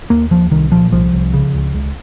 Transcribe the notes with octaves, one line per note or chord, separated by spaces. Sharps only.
D#2 A#3
D#2 F3
C2 D#3
A#2 F3
C2 F3
C2
C#3
C#2
C#2